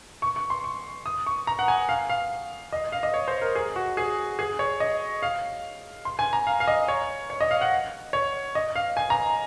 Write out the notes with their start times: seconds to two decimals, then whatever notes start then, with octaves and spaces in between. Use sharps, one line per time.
0.22 C#6
0.36 C#6
0.50 C6
0.64 C#6
1.06 D#6
1.26 C#6
1.47 A#5
1.59 F#5
1.68 G#5
1.89 F5
2.10 F5
2.73 D#5
2.92 F5
3.03 D#5
3.14 C#5
3.28 C5
3.41 A#4
3.55 G#4
3.76 F#4
3.97 G#4
4.39 G#4
4.59 C#5
4.80 D#5
5.22 F5
6.05 C6
6.19 G#5
6.33 A#5
6.47 F5
6.60 F5
6.67 D#5
6.88 C#5
7.30 C#5
7.41 D#5
7.51 F5
7.61 F#5
8.13 C#5
8.55 D#5
8.76 F5
8.97 G#5
9.10 A#5